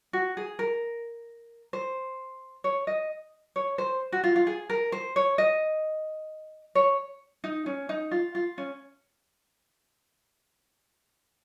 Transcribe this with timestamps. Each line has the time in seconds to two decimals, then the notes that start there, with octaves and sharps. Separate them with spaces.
0.13 F#4
0.37 G#4
0.59 A#4
1.73 C5
2.64 C#5
2.87 D#5
3.56 C#5
3.78 C5
4.12 F#4
4.24 F4
4.36 F4
4.47 G#4
4.70 A#4
4.92 C5
5.16 C#5
5.38 D#5
6.75 C#5
7.44 D#4
7.66 C#4
7.89 D#4
8.11 F4
8.35 F4
8.58 C#4